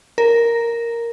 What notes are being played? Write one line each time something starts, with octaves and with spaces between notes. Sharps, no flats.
A#4